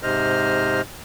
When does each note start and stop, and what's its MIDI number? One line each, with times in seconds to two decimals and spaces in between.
0.03 0.81 44
0.03 0.81 48
0.03 0.81 72
0.03 0.81 75
0.03 0.81 89